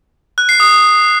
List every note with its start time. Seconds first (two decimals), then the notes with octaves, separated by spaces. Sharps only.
0.38 F#6
0.49 C7
0.60 D#6